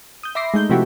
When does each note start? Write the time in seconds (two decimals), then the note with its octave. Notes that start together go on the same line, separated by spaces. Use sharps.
0.23 D#6 G6
0.35 E5 B5 C6 D6 A#6 C7
0.54 G#3 A3 D#4 G6
0.69 C3 F3 A3 E4 F#4 G4